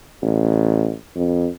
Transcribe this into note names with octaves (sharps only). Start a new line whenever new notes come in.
A1
F2